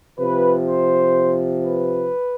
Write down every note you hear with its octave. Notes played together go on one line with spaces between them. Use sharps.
C3 F3 B4
C5
B4